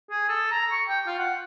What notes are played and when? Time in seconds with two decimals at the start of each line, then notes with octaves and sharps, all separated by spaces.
0.11 G#4
0.29 A4
0.52 A#5
0.72 C#6
0.89 G5
1.07 F4
1.19 F#5